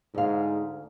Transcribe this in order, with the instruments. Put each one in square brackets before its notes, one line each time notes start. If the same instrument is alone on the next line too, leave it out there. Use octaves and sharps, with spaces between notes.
[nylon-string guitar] D2 F5 [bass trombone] G#2